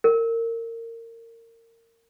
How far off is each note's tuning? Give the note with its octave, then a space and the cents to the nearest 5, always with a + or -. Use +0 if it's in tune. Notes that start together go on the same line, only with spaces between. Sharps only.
A#4 -25